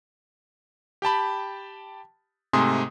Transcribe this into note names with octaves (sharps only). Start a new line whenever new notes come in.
G4 G5 A5 B5
G#2 C3 A3 G#5 C6 D#6